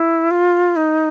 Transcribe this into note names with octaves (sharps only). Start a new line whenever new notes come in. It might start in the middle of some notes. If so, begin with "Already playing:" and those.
Already playing: E4
F4
D#4